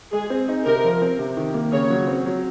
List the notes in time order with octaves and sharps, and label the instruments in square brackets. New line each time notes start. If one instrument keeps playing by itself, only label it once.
[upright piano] G#3 [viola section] G#4
[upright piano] C4
D#4
[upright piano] C3 [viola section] A#4
[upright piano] F3
C4
C3
D#3
A#3
[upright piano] C#3 [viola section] C#5
[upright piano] F#3
C4
F#3